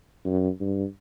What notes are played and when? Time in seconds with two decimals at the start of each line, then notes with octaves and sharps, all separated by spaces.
0.25 F#2
0.60 G2